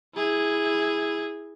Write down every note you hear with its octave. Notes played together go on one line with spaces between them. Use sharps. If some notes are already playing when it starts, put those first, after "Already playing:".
E4 G#4